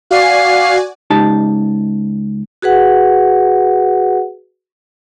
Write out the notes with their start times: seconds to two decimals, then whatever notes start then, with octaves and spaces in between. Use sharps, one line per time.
0.11 F#4 D5 F5 G#5
1.10 C#2 D#4 G4 A5
2.62 F#4 G#4 B4 F#5